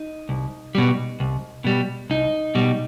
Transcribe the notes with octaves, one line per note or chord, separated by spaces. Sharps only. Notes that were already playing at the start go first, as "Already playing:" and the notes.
Already playing: D#4
C2
B2 G3
C2
B2 G3
C2 D#4
B2 G3